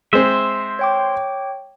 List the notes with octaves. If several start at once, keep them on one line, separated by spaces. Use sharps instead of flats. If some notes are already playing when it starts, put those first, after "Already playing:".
G#3 C4 C5 E5
C#5 G5 D6